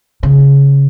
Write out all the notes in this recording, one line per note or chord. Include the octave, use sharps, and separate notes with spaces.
C#3